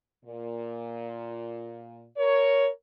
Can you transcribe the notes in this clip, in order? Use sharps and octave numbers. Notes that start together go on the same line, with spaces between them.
A#2
A#4 C#5